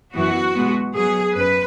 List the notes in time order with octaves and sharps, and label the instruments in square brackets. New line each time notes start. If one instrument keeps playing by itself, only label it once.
[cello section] F#2 E3 B3 F#4
B2 G#3 B3
B2 F#3 B3 G#4
F#2 B4